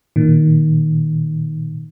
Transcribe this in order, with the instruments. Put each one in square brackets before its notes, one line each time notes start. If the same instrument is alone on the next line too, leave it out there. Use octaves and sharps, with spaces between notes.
[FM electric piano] A#2 D#3